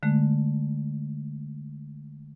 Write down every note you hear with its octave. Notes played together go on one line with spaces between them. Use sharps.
D3 G#3 A3